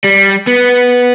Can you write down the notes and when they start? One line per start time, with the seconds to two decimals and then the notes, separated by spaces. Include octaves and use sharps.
0.04 G3
0.47 B3